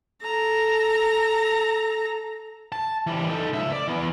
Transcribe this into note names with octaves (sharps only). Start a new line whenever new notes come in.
A4 A#5
A5
E3 G3
D#4 A4
C#2 E5
D5
E3 B3